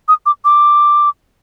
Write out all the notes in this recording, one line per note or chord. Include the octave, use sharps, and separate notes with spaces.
D#6
D6
D6